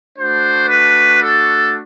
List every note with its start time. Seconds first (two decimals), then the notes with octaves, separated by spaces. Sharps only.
0.17 A3 D4 F#4 C5
0.68 B4
1.20 A4